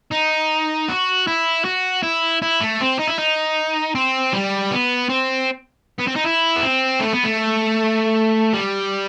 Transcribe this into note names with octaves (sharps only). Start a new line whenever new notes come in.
D#4
F#4
E4
F#4
E4
E4
A3
C4
D#4
E4
D#4
C4
G3
B3
C4
B3
C4
D#4
E4
B3
C4
A3
B3
A3
G3